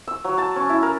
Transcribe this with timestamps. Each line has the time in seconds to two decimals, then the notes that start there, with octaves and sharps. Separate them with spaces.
0.07 E6
0.24 F#3
0.38 A5
0.56 C#4
0.69 E4
0.83 A#4